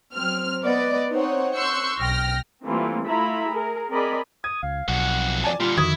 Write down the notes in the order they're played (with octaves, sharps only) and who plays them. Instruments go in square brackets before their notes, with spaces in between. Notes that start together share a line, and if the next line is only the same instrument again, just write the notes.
[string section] F#3 C4 F6
B3 B4 D5 D#5 F#5
C4 D#4 C5 C#5 F#5
C6 C#6 E6 F#6 G6 C#7
B1 G5 F6 A#6
[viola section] E3 G3 A3 A#3 C4 F4
A3 E4 F4 E5 A#5 B5
G#4 A#4
C4 G#4 A#4 D5 D#5 B5
[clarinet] D#6 [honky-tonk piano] G#6
[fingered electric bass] C#2 [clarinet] F5
[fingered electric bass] B1 [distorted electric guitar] F2 F#4 [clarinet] F#5
[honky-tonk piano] D5 G#5 A5
[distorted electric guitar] A#2 D3 [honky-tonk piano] G3 [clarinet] F4
[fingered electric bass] F2 D3 D#3 [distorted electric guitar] E4 [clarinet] F#4 [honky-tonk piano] D#6 G#6